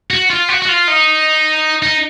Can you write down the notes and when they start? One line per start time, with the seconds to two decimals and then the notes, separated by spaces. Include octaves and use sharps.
0.10 F#4
0.30 F4
0.49 F#4
0.62 F#4
0.69 F4
0.88 D#4
1.83 D#4